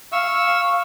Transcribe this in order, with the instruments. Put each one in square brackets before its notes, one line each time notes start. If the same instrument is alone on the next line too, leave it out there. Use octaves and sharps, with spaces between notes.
[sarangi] F5 [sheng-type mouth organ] C#6 E6